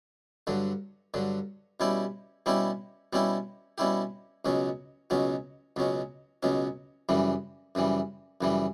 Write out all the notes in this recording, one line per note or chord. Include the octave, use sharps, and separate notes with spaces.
G2 D3 F#3
G2 D3 F#3
B2 G3 C#4 E4 G4
B2 G3 C#4 E4 G4
B2 G3 C#4 E4 G4
B2 G3 C#4 E4 G4
C#2 B2 F#3 C#4
C#2 B2 F#3 C#4
C#2 B2 F#3 C#4
C#2 B2 F#3 C#4
F#2 C#3 E3 G3
F#2 C#3 E3 G3
F#2 C#3 E3 G3